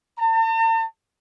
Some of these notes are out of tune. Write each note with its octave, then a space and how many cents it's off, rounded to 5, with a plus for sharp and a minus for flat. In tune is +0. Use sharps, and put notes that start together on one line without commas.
A5 +45